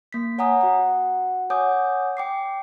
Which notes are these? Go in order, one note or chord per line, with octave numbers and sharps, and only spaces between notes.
A#3 B6
C#5 F#5 G#5 A#5 D#6
F#4 F#5
C#5 F#5 G#5 D6 D#6 G6
G5 D6 C7